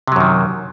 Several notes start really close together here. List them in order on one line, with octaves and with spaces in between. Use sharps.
C3 F#3 F#2 D#3